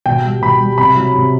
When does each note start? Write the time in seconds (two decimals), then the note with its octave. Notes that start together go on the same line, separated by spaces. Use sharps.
0.06 B2 G5
0.24 G3
0.42 B2 B5
0.60 G3
0.78 C3 B5
0.96 F#3
1.14 C3